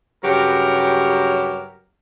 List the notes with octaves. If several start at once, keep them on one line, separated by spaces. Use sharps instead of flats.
G2 C#3 F#3 G4 A#4